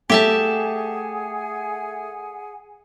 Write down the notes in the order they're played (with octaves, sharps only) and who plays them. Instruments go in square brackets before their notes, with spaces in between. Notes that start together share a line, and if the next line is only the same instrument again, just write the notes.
[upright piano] A3 [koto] G4 E5 A5 [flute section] G#4 F#5 G#5